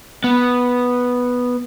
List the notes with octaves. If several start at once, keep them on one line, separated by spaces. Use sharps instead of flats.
B3